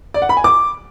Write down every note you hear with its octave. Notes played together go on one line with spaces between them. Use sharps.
D5
F#5
B5
G#5
D6